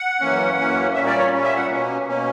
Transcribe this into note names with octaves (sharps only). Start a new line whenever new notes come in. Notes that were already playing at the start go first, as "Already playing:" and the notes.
Already playing: F#5
F#2 E3 A#3 C#4
F#2 E3 A#3 C#4
A#2 G3 A#3 C#4 E5
D5
C#5
A#2 G3 A#3 C#4
E5
F#5
B2 A#3 C#4
B2 A#3 C#4